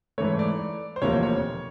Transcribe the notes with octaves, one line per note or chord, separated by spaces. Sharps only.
G#2 E3 A3 C#5
D5
C5
E1 D2 C3 F3 A#3 C#5
C#5